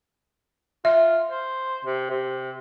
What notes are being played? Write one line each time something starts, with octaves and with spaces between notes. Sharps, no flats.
F4 E5
C5
C3
C3